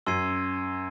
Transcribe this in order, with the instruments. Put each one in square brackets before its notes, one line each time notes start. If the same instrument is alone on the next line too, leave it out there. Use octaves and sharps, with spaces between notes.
[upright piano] F#2 [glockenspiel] C6 E6 G#6 C7 D#7